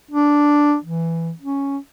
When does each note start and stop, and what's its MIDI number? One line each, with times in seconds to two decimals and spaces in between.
0.11 0.76 62
0.84 1.31 52
1.41 1.78 61